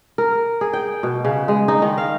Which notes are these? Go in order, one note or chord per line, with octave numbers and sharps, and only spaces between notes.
A#4
G#4
G5
B2
C#3
G#3
D#4
D#3
F5